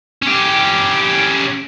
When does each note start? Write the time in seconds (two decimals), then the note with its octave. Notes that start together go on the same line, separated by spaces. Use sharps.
0.22 C#4 G4